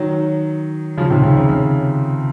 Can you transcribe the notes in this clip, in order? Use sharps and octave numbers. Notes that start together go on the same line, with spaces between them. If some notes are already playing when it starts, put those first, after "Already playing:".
Already playing: D#3 F#3
C#3 F3
C3 D#3
C#3
C#3
C#3